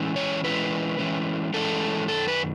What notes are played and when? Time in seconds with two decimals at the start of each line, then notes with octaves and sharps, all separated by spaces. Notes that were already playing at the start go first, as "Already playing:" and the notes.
Already playing: E3 G#3 C#4 E4
0.16 C#5
0.44 E3 G#3 C#4 E4 B4
0.98 E3 G#3 C#4 E4
1.54 E3 G#3 C#4 E4 A4
2.08 F#2 D#3 A4
2.28 B4